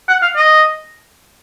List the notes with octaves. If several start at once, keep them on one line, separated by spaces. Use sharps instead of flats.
F#5
F5
D#5